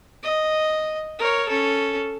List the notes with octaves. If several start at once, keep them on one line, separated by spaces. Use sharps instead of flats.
D#5
A#4 C#5
C#4 A4